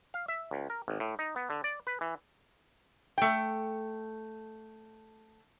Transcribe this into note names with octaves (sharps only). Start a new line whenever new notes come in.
F5
E5
C#2
A#4
G#1
A2
D#4
B3
D3
D5
B4
E3
A3 G5